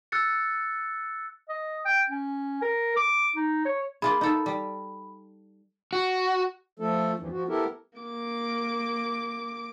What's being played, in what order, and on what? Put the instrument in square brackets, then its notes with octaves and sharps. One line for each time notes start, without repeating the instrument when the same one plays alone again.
[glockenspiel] E6 F#6 A6 C#7
[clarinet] D#5
G5
C#4
A#4
D6
D#4
C#5
[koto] A#3 F4 G#4 [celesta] B5
[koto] D#4 A4
G3
[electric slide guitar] F#4
[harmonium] F3 A3 A4
E2 G2 E3 F3
F3 F#4
B3 E4 G4 A4 A#4
[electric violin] A#3 D6